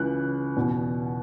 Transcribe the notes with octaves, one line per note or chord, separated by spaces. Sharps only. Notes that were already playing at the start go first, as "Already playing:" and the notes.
Already playing: C#2 C#3 E3 F#6
E2 B2